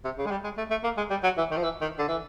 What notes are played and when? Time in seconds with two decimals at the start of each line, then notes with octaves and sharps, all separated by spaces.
0.04 C3
0.18 C#3
0.26 G#3
0.31 G3
0.44 G#3
0.57 A3
0.70 A3
0.84 A#3
0.97 G#3
1.10 G3
1.23 F#3
1.38 E3
1.51 D#3
1.57 F3
1.63 E3
1.81 D#3
1.99 D3
2.08 E3